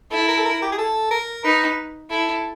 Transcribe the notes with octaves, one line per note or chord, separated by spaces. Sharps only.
E4 A4
A#4
A4
A#4
G4
G#4
A4
A#4
D#4 B4
E4 A4